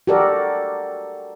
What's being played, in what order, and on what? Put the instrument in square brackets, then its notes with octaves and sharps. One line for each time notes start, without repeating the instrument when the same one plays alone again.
[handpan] F#4 G4 A4 A#4 D5